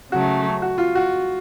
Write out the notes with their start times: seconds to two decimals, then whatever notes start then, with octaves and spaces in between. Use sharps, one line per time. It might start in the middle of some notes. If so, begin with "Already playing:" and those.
0.12 C#3 F#3 A3 F#4
0.62 F#4
0.78 F4
0.95 F#4